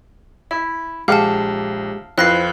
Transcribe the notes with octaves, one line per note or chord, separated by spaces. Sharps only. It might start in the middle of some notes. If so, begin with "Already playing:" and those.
E4 E5
A#1 G#3 G4 F5 F#5 A5 D6 F6
F2 C4 E4 F4 B4 F#6 A#6 C7